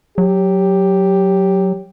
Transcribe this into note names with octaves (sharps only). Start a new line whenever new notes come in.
F#3 G4